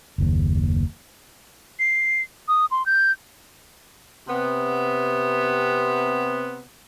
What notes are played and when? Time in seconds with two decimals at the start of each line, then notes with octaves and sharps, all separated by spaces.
0.18 F#1 D#2
1.79 C7
2.48 D#6
2.71 C6
2.86 G6
4.28 C3 B3